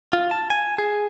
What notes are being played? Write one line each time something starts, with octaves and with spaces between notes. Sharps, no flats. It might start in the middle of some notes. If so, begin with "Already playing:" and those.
F4
A5
G#5
G#4